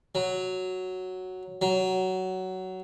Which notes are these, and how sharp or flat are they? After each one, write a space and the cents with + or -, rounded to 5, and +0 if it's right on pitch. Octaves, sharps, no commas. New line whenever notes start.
F#3 +0
F#3 +15